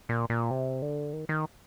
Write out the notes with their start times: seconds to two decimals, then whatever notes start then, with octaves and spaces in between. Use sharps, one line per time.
0.09 A#2
0.30 A#2
0.51 C3
0.82 D3
1.13 D#3
1.29 D#3